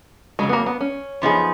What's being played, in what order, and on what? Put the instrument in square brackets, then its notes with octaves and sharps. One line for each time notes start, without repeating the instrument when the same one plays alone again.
[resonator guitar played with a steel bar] F2 C#3 F#3 [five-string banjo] G#3
[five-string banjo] B3
A#3
B3
C#4
[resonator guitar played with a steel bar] F#2 F3 B3 D#4 G#4